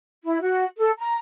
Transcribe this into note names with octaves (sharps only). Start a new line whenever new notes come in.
E4
F#4
A4
A#5